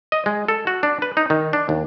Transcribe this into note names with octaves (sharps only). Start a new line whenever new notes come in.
D#5
G#3
A4
F#4
D4
B4
D#4
D#3
D4
D#2